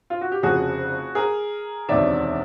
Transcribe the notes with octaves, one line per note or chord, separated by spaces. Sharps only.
F4
F#4
G4
F1 F2 C#3 F#4 G#4
G#4 A#4
E1 D2 C3 D#3 D5 E5